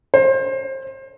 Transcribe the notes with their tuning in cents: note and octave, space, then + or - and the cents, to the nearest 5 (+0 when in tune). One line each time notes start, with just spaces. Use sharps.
C5 +30